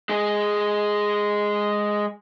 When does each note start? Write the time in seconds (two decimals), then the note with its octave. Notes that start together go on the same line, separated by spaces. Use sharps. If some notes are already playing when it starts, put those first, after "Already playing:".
0.09 G#3 G#4